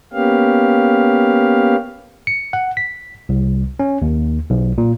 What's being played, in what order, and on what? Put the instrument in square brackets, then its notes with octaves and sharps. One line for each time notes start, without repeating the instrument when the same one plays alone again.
[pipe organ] A#3 B3 C#4 G4 F5
[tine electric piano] C#7
F#5
B6
C2
C#4
D#2
B1
A#2